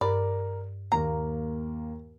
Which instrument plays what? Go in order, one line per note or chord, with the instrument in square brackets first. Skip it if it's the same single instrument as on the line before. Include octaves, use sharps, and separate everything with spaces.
[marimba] G2 [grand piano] A#4 [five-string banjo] D5
[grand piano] D#2 A#3 [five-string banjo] A#5